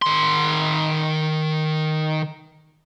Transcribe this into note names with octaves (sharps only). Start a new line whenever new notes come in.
D#3 C6